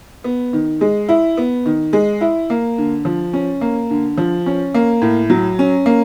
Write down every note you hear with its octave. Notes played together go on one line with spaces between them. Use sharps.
B3
D#3
G#3
E4
B3
D#3
G#3
E4
A#3
D3
F3
C#4
A#3
D3
F3
C#4
A#3
A2
F#3
C#4
A#3